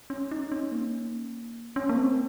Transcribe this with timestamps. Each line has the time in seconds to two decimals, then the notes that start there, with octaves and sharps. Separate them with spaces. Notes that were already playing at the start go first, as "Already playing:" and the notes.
0.10 C#4
0.31 D#4
0.52 C#4
0.72 A#3
1.76 C#4
1.89 A#3
1.97 C4